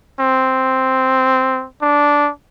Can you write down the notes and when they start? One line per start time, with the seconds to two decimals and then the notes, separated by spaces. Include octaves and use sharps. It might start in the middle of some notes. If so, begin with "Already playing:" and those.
0.19 C4
1.82 D4